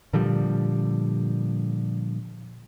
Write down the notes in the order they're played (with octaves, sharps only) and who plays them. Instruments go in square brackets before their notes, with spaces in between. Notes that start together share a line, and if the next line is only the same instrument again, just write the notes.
[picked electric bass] A#2 D3 F3 G3